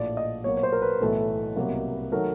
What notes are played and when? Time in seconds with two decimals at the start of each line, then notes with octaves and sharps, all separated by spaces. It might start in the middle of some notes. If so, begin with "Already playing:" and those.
Already playing: A#1 A2 F3 D5
0.17 D#5
0.44 B1 A#2 F#3 A#3 C#5
0.57 C#5
0.63 C5
0.72 A#4
0.82 B4
1.01 B1 A2 E3 A3
1.56 C2 B2 F#3 A#3
2.12 D#3 F#3 A3 A#4